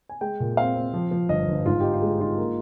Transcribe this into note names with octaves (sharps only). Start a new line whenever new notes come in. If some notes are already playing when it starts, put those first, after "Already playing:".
G#5
G#3 G5
A#2
C4 F5
C4
F3
F3
G1 D#5
G1
G#2 F4
D#4 G4
F4
G#3
G4
D#4 F4
A#3